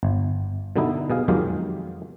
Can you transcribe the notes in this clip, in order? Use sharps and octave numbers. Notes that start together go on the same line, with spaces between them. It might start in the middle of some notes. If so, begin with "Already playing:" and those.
G1
B2 D3 G3 B3 D#4 E4
B2 G#4 F5
F2 D#3 F#3 G#3 G4 F5